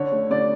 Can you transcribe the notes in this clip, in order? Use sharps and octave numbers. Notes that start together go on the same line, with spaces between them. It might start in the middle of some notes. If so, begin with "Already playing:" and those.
Already playing: D3 C#5
A3
D3 D5